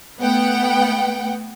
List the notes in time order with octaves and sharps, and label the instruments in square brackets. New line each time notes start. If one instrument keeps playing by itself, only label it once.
[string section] A3 B3 F#5 G5